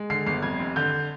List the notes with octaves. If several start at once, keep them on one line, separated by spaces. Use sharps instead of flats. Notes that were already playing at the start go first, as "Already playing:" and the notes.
Already playing: G#3
D3 C7
G1 C7
F2 G#6
F1
D3 G6